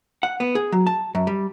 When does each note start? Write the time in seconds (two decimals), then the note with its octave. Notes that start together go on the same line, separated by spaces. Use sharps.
0.23 F#5
0.40 B3
0.55 G#4
0.72 F#3
0.87 A5
1.15 F#2
1.27 G3